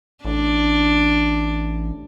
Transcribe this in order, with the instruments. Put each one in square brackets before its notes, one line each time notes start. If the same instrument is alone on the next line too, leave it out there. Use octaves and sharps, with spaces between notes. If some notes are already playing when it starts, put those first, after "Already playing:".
[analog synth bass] A1 [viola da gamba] D4